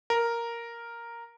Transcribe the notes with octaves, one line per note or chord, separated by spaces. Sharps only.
A#4